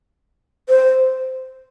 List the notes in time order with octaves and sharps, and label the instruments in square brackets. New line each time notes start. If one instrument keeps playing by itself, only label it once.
[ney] C5